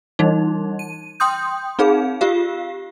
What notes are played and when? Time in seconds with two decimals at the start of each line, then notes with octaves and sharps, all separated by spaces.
0.19 E3 G3 D#4
0.79 D#7
1.20 G5 C6 D#6 G6
1.79 C4 D#4 G#4 F5
2.21 F4 G4 F5